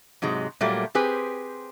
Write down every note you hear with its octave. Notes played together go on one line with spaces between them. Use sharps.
G#2 C3 F#3 G#3
A#2 F#3 G3 A3 A#3
C4 G4 G#4 B4 C5